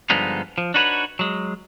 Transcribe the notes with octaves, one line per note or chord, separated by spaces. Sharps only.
G2 D3 F3 G#3 B3 D#4
F3
D4 D#4 F#4 B4 C#5
F#3 G#3